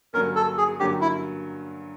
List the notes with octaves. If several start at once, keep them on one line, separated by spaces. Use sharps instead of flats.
G2 D3 F#3 A#3 C#4 A#4
A4
G#4
G2 D3 F#3 A#3 C#4 G4
E4